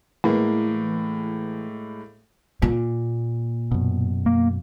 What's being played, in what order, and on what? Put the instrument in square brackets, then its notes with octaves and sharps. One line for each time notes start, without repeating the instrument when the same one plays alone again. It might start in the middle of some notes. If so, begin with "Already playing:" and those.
[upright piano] A2 G#3 A#3 [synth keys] E3
[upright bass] A#2
[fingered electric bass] F#2 B2
[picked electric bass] A#3